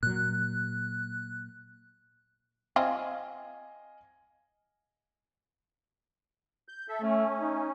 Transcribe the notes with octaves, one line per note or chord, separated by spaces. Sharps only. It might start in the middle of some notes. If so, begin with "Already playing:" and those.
A#2 F#3 F#6
C4 F4 D#5 F5 G#5
G6
A4 E5
A3 C#4
D#4